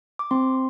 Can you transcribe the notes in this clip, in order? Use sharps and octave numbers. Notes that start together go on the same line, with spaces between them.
D6
C4 C6